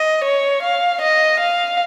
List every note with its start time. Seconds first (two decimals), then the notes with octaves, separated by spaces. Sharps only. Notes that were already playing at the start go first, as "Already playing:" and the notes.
Already playing: D#5
0.24 C#5
0.63 F5
1.02 D#5
1.40 F5